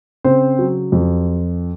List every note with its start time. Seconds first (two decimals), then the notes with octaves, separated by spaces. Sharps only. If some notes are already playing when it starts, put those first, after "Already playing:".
0.24 C#3 C4 C5
0.59 F#3
0.92 F2